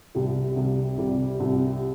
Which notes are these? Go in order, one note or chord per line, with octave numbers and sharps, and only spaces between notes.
C2 C3 G3
C2 C3 G3
C2 C3 G3
C2 C3 G3